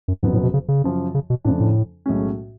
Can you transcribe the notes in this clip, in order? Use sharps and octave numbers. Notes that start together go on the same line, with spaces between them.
F#2
F#1 F2 G#2 C#3 F#3 B3
A2
B2
C#3
C#3
F#2 C#3 F3
C#3
B2
F2 A2 C#3 F3 A3 D4
A2
B1 A2 G#3 C#4